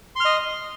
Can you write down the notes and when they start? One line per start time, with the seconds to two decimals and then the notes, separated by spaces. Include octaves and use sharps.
0.16 C6
0.20 F6
0.25 D#5